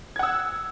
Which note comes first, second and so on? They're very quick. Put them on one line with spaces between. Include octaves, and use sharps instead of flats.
G#6 F#5 E6